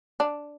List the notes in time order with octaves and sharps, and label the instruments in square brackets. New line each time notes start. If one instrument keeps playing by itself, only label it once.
[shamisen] D4